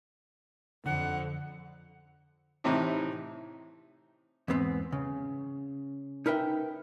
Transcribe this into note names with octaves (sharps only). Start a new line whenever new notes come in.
F2 D3 F#5
A2 C3 E3 D#4
E2 G#2 B3 C4
C#3
D#4 A#4 B4 E5 G5